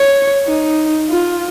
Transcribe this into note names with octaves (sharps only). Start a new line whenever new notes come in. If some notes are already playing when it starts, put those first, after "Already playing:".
Already playing: C#5
D#4
F4